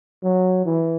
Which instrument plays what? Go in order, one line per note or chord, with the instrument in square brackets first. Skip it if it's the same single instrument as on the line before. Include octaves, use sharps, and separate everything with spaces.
[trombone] F#3
E3